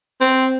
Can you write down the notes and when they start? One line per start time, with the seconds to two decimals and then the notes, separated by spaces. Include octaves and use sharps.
0.21 C4